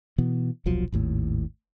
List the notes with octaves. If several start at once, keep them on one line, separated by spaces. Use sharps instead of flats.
B2 E3 B3
D#1 B1 F3 F#3
G#1 D#2 A2